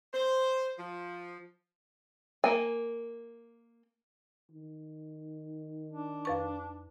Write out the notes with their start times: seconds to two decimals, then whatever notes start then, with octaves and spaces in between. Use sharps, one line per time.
0.14 C5
0.78 F3
2.44 A#3 G#5
4.51 D#3
5.92 D4
6.25 F2 B4 C#6